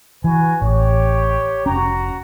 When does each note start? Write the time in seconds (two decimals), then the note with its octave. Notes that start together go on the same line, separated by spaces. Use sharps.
0.24 E3 F#4 B4 G#5
0.62 A1 G4 C#5
1.66 F1 C#4 F#4 A#5